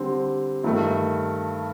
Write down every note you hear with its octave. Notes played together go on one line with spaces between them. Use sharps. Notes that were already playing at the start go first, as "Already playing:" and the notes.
Already playing: D3 G3 C4
G2 D#3 A3